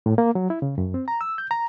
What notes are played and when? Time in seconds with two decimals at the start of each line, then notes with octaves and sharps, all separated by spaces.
0.06 A2
0.18 A#3
0.35 F#3
0.50 E4
0.62 C#3
0.78 F#2
0.94 C4
1.08 A#5
1.21 E6
1.38 G6
1.51 A#5